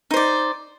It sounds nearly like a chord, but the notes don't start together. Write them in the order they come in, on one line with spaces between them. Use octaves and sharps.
D#4 C5 D5